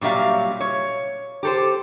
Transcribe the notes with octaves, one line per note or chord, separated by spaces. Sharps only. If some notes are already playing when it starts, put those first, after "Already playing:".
A#2 F#3 G3 E5 F5
C#5
G4 A4 C5